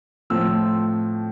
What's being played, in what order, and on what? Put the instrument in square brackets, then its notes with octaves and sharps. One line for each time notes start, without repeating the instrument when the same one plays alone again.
[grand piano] A2 F3 A3 C4 E6